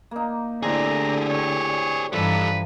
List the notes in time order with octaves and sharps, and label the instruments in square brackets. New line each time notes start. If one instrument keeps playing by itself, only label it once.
[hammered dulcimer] A#3 D#4
[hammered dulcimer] A2 C4 D4 [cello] D3 [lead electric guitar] G4 G#4 [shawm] A#5
[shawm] C#5
[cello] G2 E3 [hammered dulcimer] F3 D#4 [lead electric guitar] G3 A4 [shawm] B4